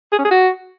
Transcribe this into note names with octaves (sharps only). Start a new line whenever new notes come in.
G#4
C#4
G#4
F#4